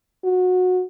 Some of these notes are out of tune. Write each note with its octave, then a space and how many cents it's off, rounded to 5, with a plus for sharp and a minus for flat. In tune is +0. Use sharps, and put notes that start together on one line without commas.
F#4 -20